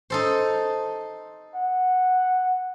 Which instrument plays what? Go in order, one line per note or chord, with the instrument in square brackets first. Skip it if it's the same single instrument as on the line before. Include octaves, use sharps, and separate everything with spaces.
[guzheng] D#4 A4 C5
[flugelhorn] F#5